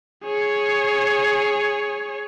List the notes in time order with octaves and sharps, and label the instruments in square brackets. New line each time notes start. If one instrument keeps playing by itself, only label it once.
[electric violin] G#4 C#5